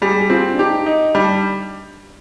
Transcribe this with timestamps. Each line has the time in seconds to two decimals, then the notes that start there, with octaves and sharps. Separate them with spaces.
0.02 G3 G#4
0.21 G4
0.30 C4 F4
0.54 D4
0.59 D#4 G4
0.86 D#4
1.15 G3 D4